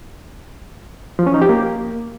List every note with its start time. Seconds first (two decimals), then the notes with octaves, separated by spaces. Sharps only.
1.19 F3
1.26 C#4
1.34 D#4
1.42 G4
1.49 A#3